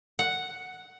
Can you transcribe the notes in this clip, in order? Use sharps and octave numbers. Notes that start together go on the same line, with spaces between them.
F#5